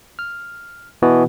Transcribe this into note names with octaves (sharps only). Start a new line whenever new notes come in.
F6
B2 E3 B3 F#4